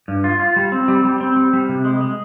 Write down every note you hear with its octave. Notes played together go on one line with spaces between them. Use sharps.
G2
F4
F4
G3
C4
G3
G3
C4
G3
G3
C3
G#3
G#3